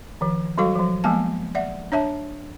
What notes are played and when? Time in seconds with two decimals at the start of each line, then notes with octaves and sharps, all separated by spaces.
0.21 D#3 F3
0.58 F#3 G3 F#4 A4 F5
0.75 F3 F#3
1.04 F3 G#3 A#3 B3 G#5 A5
1.55 D5 E5 F#5
1.92 D4 C#5 E5 A5